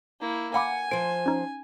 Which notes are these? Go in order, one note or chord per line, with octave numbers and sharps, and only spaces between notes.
A#3 E4
F5 F#5 G#5 B5 D6
F3 C5 D7
C#4 D#4